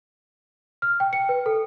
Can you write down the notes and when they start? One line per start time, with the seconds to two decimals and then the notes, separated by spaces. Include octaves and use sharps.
0.82 F6
1.00 G5
1.13 C#7
1.29 B4
1.46 A4